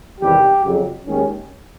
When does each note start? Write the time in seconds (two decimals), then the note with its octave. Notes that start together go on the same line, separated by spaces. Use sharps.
0.20 E2 C3 D#3 G3 G4
0.63 F2 C#3 F#3
1.06 D#2 D#3 G#3 C#4